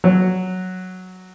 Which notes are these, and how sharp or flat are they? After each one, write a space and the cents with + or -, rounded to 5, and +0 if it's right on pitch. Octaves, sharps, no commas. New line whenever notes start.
F#3 +0